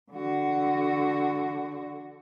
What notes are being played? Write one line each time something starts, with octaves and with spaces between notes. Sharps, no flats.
D3 F#4